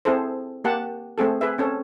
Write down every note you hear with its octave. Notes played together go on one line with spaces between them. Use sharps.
C4 E4 G#4 A4 C5
A#3 G4 F#5 A5
A3 C4 G#4 A4
G#4 B4 E5
C4 C#4 A4